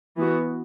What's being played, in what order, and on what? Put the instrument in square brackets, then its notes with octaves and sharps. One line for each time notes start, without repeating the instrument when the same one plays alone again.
[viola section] E3 B3 F#4